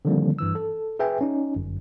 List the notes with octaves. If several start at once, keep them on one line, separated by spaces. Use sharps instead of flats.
D3 D#3 F3 G3 A#3 C4
G2 E3 E6
A4
G#4 B4 E5 G5 G#5
C#4 D#4
G1 F#2